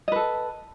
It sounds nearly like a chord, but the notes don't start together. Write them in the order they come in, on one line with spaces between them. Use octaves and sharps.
D#5 B4 A4